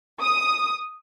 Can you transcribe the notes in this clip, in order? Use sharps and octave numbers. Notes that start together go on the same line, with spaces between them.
D#6